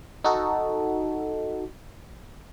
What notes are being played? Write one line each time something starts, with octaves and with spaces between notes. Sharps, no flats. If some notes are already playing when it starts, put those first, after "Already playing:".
D#4 F#4 A4